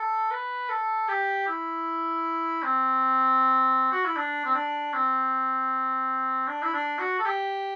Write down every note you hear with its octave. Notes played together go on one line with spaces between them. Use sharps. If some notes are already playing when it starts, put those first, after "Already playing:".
Already playing: A4
B4
A4
G4
E4
C4
F#4
E4
D4
C4
D4
C4
D4
E4
D4
F#4
A4
G4